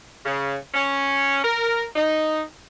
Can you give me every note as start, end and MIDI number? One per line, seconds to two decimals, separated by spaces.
0.25 0.55 49
0.74 1.43 61
1.43 1.84 70
1.96 2.41 63